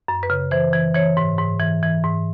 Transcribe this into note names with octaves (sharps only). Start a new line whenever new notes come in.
F#2
B4
C#3
E3 C5
E3
E3 C#5
G#2
G#2
E3
E3
G#2